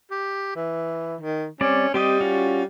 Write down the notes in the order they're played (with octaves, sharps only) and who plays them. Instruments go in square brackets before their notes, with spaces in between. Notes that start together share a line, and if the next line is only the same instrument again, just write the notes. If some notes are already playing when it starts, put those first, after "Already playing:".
[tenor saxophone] G4
E3
D#3
[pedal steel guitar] G3 C4 D5 [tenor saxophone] C#4
[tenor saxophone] G3 [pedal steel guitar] C4 G4 D#5
[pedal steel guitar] C#4 F4 F#4